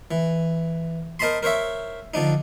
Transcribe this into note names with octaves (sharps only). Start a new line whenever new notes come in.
E3
A#4 C5 D#5 A5 B5 C6
A#4 C5 C#5 E5
D3 F3 D4 D#4